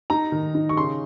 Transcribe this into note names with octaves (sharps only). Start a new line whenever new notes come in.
D#4 A#5
D#3
D#4
C#6
C#3 C6